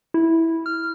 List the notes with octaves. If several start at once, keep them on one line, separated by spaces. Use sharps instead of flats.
E4
F6